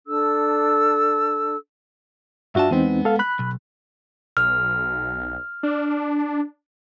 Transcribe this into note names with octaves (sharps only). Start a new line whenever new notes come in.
D4 A4 E6
G2 D4 F4 F#4 E5 A5
E2 G#3 B3 C4 D#4
A4 F5
B5 F#6
B1
B1 F6
D4